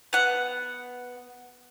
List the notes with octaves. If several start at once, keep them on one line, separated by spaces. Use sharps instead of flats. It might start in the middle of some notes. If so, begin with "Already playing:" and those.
B3 F#5